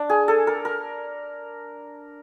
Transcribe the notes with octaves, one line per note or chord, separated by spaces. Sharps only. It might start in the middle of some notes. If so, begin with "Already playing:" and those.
Already playing: D4
G#4
A4
A#4
A#4